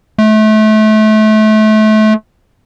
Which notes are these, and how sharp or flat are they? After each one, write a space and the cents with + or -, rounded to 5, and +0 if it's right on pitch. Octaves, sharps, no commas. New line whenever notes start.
A3 -30